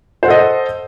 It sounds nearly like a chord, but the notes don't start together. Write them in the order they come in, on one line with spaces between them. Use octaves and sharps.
C5 F#5 A4 D#5